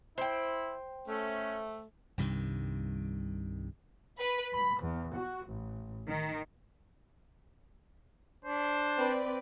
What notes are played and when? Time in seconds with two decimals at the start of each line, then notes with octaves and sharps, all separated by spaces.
0.18 E4 C5 G5
1.08 A3 C#4
2.18 C2 G2 C3 D#3
4.18 B4
4.54 B5
4.84 E2
5.18 F#4
5.50 A1
6.09 D#3
8.45 D4 C5
8.98 C4 B4 D5